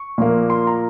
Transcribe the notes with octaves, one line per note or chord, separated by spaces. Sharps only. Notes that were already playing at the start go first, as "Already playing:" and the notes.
Already playing: C#6
A#2 F3 A#3
C6
A#5